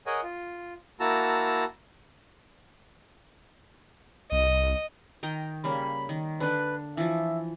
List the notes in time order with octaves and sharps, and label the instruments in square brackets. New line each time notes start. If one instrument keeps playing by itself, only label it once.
[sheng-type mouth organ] G#4 A#4 C#5 D#5 F#5 G#5
F4
A#3 E4 F#4 A5 A#5 E6
[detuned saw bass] C2 [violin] D#5
[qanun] D#3 G5 A#5
[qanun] C#3 G3 A#3 [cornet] B5
[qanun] D#3
[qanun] D3 D4 [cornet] B4
[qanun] E3 F3 [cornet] E5